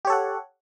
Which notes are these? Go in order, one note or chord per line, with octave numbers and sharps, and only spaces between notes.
G4 A4 C#5 F#5